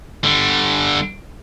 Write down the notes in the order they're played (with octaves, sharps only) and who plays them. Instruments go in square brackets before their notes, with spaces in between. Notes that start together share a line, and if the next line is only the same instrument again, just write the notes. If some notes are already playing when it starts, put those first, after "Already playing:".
[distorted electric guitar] D3 G3